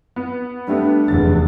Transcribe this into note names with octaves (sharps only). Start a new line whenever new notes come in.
B3
G3 A3 B3 D4
F1 E2 A6